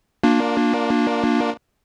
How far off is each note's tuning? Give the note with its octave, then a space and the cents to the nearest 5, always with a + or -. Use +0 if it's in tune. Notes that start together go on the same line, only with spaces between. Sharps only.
A#3 +0 D4 +0 F4 +35